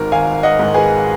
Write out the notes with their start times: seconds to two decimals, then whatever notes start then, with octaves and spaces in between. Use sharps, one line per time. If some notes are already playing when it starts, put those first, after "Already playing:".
Already playing: G#1 G#2 D#3 A#4
0.12 G#1 F5 G#5
0.43 D#5 F#5
0.59 G#2 D#3
0.74 G#4 B4